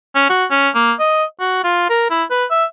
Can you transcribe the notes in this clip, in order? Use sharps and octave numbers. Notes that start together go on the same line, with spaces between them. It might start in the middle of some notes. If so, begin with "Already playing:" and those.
C#4
F#4
C#4
A#3
D#5
F#4
F4
A#4
E4
B4
E5